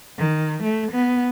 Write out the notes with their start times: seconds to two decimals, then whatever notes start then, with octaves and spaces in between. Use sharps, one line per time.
0.18 D#3
0.63 A3
0.92 B3